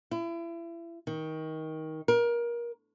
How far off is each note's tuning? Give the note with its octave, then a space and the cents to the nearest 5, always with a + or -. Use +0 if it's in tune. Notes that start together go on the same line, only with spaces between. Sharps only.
E4 +35
D#3 +20
A#4 +25